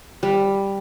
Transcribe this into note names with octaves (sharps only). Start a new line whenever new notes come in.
G3